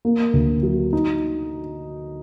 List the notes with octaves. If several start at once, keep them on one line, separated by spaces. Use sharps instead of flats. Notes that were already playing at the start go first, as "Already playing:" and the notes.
A#3
D2
F#3
D#4